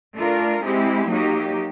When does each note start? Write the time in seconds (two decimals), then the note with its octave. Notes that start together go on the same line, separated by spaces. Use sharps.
0.16 A3 D4 F4 A#4
0.63 G#3 C4 E4 G4
1.10 F#3 A#3 D#4 G4